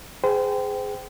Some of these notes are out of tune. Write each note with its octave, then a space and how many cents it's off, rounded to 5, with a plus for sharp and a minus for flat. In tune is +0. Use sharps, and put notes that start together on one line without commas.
G#4 +0 C5 -35 G5 -20